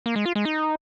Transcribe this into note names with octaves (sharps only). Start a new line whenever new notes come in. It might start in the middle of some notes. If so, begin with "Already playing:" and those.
A#3
G#3
F4
G#3
D#4